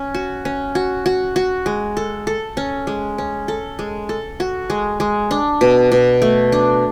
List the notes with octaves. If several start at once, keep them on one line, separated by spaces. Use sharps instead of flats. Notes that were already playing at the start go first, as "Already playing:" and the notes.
Already playing: C#4
F#4
C#4
F#4
F#4
F#4
G#3
A4
A4
C#4
G#3
C#4
A4
G#3
A4
F#4
G#3
G#3
D4
B2
B2
A3
D4